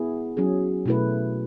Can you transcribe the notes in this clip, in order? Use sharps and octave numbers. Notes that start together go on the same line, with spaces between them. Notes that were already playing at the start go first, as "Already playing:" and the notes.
Already playing: B3 E4 G#4
F#3 C#4 G#4
B2 A3 E4 B4